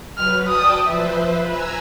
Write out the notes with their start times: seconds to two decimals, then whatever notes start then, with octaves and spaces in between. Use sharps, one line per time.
0.18 F#3 B4 F6
0.47 D5 G5 A5 D#6
0.87 F3 B4 C5 E5
1.47 B4 G#5 A#5 E6